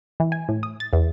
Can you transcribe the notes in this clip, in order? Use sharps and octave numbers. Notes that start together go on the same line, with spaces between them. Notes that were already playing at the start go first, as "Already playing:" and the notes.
E3
G#5
A2
D#6
A6
E2